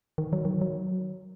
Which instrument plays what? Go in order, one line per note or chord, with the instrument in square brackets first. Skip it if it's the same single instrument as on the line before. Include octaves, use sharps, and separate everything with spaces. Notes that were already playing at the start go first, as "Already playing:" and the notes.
[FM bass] D#3
F#3
D#3
F#3